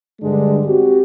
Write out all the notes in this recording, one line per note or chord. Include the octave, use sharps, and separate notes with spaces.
G2 D3 G#3 D4
C4 F#4 G4